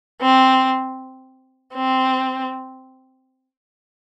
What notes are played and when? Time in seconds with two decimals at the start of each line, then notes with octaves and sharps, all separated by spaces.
0.22 C4
1.74 C4